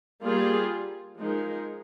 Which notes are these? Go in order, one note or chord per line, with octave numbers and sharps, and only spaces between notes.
G3 A#3 F4 G#4
F3 G#3 D#4 A#4